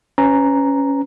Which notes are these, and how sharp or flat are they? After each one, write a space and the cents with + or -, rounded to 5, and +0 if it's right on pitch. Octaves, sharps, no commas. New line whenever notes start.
C#4 +0 B4 +25 A#5 +0